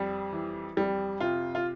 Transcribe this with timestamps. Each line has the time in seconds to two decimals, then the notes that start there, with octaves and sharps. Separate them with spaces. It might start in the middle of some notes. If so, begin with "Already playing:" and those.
Already playing: F2 G3
0.33 E3
0.77 F2 G3
1.21 C3 F4
1.55 F4